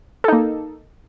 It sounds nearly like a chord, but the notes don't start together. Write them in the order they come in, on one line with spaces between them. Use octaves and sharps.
A4 D#4 A#3